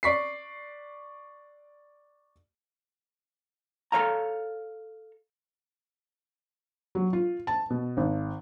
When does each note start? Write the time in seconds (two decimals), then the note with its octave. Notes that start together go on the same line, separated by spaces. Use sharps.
0.03 D5 C#6 B6 C7
3.92 A4 C5 C#5 F5 A#5
6.95 F#3
7.13 F4
7.47 A5
7.70 B2
7.97 G#1